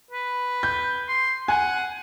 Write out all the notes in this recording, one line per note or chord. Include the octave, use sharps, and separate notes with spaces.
B4
G6
C6
F#5 G#5